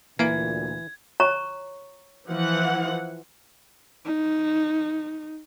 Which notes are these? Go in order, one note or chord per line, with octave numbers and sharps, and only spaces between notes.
D2 A#2 E3 A#3 G#6 D7
C#5 A#5 C#6
E3 F3 F#5
D#4